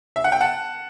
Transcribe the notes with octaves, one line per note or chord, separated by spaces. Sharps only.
E5
F#5
G5
F#5 A5